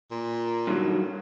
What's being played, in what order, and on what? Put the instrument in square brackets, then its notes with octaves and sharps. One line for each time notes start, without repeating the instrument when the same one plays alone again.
[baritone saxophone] A#2
[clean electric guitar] G2 D#3 F#3